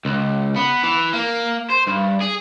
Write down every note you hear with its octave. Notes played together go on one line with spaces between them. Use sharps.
C#2
B3
E3
A#3
C5
G2
G#4